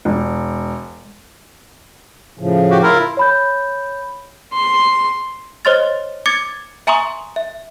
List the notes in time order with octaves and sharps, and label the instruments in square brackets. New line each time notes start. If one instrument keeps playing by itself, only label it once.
[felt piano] E1
[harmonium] A2 C#3 F3
[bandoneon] F#4 G4
E4 F4 A#4
[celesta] C#5 B5 G6
[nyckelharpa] C6
[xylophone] C5 C#5 D#5 C6 F6 A6
D6 G#6 A6 C#7
E5 G#5 A#5 C6 C#6 D#6
E5